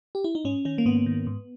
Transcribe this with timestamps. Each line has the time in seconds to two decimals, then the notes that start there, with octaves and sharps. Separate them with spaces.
0.15 G4
0.24 E4
0.35 D#4
0.44 G#2 C#4
0.65 D#3 C#4
0.78 A#3
0.86 G#2 B3
1.06 D#3
1.27 G#2